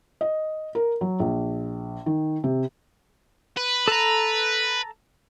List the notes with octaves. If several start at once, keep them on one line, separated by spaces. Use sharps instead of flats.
D#5
A#4
F#3
A#1
D#3
C3
B4
A4 A#5